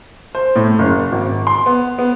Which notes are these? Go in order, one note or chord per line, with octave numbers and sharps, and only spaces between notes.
C5
A2
F#1
G#1
C6
B3
B3